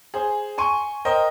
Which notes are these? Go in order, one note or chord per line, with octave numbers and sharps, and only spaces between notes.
G#4 C5
G#5 C6 C#6 D#7
A#4 C5 D#5 G5